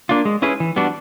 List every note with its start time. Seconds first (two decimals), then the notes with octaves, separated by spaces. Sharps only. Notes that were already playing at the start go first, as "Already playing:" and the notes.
0.09 A#3 D4 F4
0.25 G#3
0.42 C#4 E4 G#4 B4
0.60 E3
0.76 G3 B3 D4 F#4